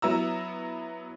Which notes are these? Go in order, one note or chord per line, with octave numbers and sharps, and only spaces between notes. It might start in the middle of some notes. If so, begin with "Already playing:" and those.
F#3 B3 E4 A#5 E6